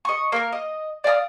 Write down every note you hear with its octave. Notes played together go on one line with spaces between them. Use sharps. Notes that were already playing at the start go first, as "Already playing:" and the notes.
D#5 C#6
A#3 A#4
D#5
D5 F5 A#5 D#6